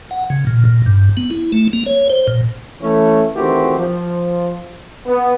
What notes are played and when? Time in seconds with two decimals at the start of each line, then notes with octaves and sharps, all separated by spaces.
0.11 F#5
0.30 C#3
0.47 A#2
0.65 A#2
0.86 G2
1.17 B3
1.31 E4
1.52 A3
1.73 A#3
1.86 C#5
2.10 C5
2.28 A#2
2.81 E3 A3 C#4
3.35 D2 D#3 E3 C4 F#4 G4
3.77 F3
5.06 B3